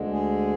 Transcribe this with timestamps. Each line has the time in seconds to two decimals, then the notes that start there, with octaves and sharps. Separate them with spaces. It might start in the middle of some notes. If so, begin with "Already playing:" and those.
Already playing: D2 D3 G#3
0.11 G#4